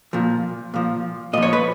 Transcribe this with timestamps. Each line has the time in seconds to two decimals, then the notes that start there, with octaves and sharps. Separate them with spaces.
0.13 A#2 F3
0.74 A#2 F3
1.33 A#2 F3 D#5
1.43 C#5
1.53 B4